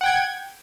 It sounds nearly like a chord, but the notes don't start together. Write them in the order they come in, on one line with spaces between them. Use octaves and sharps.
F#5 G5 G#6